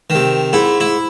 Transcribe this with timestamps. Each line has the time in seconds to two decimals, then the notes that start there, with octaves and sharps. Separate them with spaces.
0.10 D#3
0.15 C3
0.53 G#2 E4
0.80 E4